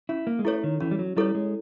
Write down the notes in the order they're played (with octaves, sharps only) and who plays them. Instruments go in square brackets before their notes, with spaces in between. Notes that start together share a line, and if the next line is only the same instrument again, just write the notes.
[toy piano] C#4 [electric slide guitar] E4
[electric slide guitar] A#3
G#3
[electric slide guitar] A3 [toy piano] E4 A4 C#5
[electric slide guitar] D#3
[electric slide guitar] E3 [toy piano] C#4
[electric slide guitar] G3
F#3
[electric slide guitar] G3 [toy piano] E4 A4 C#5
[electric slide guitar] G#3